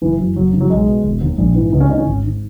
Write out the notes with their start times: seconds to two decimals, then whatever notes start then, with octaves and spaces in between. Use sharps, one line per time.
0.01 F#1 E3
0.19 F#2 E3
0.36 F#1 F#3
0.53 F#2 C#3 E3
0.61 F#3
0.70 B1 G#3
0.87 B2
1.04 E1
1.21 D#2 D#3
1.38 A#1
1.55 G#2 E3
1.72 C#2 B3
1.80 C#4
1.89 C#3 D#4
1.92 E3
1.98 C#4
2.06 G#1
2.23 G#2 D#3